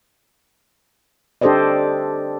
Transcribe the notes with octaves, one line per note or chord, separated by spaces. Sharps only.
D4 G4 A4 C5 D5 D#5